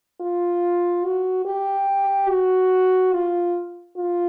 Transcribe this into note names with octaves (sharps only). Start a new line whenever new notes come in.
F4
F#4
G4
F#4
F4
F4